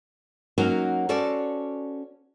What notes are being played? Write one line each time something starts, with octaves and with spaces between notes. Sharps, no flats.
F#3 A#3 C#4 D#4 F#4 A#4
C#4 F#4 A4 C5 D5